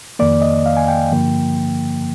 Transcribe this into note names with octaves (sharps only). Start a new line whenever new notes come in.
F2 D#3 A#3 D5
D#5
F5
G#5
G5
G2 D3 F3 A#3